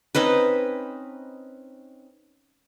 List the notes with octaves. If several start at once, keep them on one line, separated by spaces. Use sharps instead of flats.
C4 C#4 D#4 B4